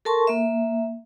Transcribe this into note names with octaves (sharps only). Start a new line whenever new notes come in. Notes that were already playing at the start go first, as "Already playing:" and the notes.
A4 A#4 A5 C6 C#6
A#3 E5